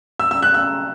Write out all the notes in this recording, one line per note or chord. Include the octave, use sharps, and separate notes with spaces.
E6
E6
F#6
E6